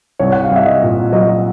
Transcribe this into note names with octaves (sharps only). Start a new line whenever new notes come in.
C2 C#5
F#5
F5
C2 E5
D#5
A#2
F#3 D#5